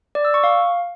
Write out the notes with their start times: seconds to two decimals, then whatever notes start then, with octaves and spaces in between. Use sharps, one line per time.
0.15 D5
0.25 E6
0.34 C#6
0.44 F5